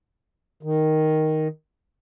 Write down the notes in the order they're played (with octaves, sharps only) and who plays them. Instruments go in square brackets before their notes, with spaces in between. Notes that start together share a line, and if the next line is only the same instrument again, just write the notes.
[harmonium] D#3